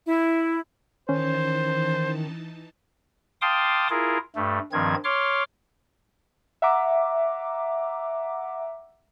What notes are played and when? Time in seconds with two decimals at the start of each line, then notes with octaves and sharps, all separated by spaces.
0.06 E4
1.09 D#3 E3 C#4 D#4 C5 A5
3.41 F5 G5 A5 C6 D6 D#6
3.90 E4 F4 G#4 A#4
4.35 G2 A3
4.72 G2 D#3 F3 C4 G#6
5.04 C#5 C6 D6 F6
6.62 E5 F#5 A#5 D6